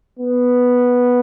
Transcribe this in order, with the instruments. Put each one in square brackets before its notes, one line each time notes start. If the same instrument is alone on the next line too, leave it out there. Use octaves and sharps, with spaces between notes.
[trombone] B3